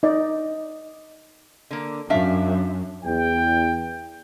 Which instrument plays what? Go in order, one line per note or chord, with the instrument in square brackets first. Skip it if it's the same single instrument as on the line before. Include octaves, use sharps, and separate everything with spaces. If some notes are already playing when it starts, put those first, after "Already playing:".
[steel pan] D#4 D5
[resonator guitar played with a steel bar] D3 A#3
[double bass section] F#2 [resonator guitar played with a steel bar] D4 E5 F5
[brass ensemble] E2 G5